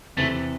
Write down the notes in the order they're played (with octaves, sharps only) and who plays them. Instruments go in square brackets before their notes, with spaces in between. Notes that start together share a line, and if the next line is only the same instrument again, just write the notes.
[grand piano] E2 C3 E3 C4 E4 [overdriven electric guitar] A3